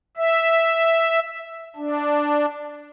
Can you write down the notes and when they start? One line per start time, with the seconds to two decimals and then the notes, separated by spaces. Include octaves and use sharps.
0.17 E5
1.76 D4